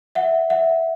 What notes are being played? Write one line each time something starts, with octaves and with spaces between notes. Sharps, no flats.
E5 F#5
E5 F#5